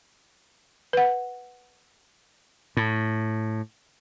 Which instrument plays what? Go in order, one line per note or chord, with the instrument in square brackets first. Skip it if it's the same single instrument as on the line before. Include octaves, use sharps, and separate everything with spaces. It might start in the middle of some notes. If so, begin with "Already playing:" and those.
[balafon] B4 F#5
[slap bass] A2